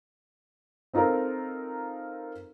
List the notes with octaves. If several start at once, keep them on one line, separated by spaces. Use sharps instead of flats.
C4 D#4 F4 A4 A#4